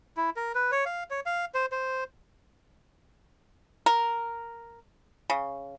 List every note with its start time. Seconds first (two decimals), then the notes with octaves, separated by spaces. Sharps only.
0.17 E4
0.36 A#4
0.55 B4
0.72 C#5
0.86 F5
1.10 C#5
1.26 F5
1.54 C5
1.72 C5
3.86 A#4
5.30 C#3